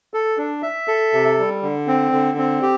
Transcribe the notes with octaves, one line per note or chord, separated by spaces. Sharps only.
A4
D4
E5
A4
C3
G3
D3
C4
D3
C4
G4